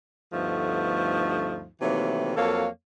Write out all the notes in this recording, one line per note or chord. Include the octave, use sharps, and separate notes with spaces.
D2 G2 F3 A3 B3 D#4
C3 D#3 E3 F#3 A3 A#3
F2 F#3 A#3 A4 C#5 F5